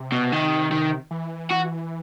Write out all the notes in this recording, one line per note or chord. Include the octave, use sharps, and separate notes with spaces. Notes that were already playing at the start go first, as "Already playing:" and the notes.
Already playing: C3
B2
D#3
D#3
E3
F#4